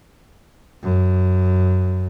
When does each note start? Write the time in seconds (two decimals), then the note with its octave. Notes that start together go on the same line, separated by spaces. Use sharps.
0.83 F#2